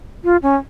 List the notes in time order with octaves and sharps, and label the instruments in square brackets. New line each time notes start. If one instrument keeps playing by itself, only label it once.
[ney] F4
C#4